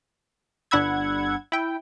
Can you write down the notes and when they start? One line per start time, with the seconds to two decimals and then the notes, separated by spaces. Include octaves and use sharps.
0.71 G1 D4 F#5 B5 E6 G#6
1.52 E4 G5